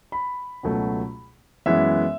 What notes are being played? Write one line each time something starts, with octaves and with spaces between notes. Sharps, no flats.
B5
C#2 B2 F#3 A3
F#2 E3 G#3 B3 E5